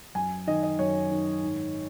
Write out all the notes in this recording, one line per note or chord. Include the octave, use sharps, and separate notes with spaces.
F#2 G#5
D#3 D#5
D#5
F#2 C#5
D#3
G#2